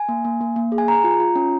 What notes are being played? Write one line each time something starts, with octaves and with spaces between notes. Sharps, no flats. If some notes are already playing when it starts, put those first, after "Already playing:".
Already playing: G#5
A#3
A#3
A#3
A#3
G#4
G#5
G#4 A#5
F4
F4
C#4